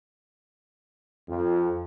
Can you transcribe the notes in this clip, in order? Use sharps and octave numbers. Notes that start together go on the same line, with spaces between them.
F2